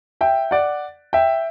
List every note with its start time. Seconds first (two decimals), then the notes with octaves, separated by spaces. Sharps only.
0.21 E5 G5
0.51 D5 F#5
1.13 E5 G5